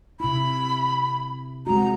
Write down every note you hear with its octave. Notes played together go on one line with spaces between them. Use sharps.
C3 E4 B5
G#3 C4 F#4 A#5